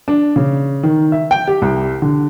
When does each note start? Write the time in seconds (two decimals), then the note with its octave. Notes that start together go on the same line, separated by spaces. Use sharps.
0.08 D4
0.36 C#3
0.83 D#3
1.12 E5
1.31 G5
1.47 G4
1.62 C2
2.02 D3